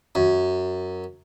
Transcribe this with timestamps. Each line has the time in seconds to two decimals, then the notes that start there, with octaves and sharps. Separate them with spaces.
0.15 F#2